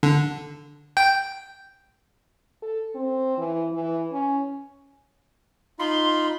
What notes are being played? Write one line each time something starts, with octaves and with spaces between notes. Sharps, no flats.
D3
G5
A4
C4
E3
E3
C#4
D#4 F4 B5 C6